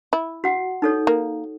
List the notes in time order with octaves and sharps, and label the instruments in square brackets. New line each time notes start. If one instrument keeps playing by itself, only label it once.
[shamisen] E4
[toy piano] F#4 F#5
D#4 A4 C#5
[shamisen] A#3